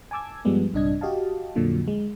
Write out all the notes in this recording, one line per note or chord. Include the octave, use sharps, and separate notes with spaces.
G#5 A5 D6 E6 G#6
G2 F3 G3 G#3 B3
A#1 G2 C3 D4 D#5 G#6
F#4 G4 D#5 F5 A5
F2 A#2 D3 F3 F#3
G#3